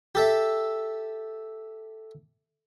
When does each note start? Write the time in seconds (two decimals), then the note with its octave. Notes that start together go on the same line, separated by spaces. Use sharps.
0.15 G4 A4 E5